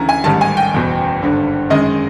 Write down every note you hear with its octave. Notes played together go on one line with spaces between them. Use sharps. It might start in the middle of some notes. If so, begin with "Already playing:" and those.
Already playing: D2 C#3 E3 A#5
G#5
A1 G#2 D#3 G3 A5
G#5
G5
F#1 E2 B2
G#1 G2 D3
F#2 D#3 G#3 D#5